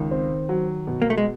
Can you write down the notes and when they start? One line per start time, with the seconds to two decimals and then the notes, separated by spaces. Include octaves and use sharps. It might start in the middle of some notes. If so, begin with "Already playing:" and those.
Already playing: C#2 D#3
0.11 C4
0.49 F#3
0.87 B2
1.02 A#3
1.10 A3
1.18 G#3